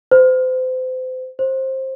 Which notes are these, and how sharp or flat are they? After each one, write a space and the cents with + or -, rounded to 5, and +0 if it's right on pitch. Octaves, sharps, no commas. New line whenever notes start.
C5 -35
C5 +20